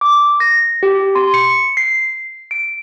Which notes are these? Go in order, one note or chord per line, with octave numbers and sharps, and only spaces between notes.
D6
A#6
G4
C6
C#7
C7
D7